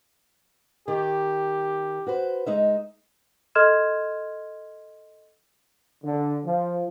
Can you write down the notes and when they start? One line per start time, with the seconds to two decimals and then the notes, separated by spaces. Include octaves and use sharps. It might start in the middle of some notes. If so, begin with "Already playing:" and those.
0.88 D#3 G4
2.07 F#4 B4 C5
2.46 G#3 D#4 E5
3.55 A4 D#5 C6 F6 G#6 E7
6.04 D3
6.44 F3